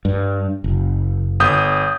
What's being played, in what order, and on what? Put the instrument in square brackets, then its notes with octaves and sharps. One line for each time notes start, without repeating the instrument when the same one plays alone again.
[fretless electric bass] G2
F#1
[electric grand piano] G1 D#6 G6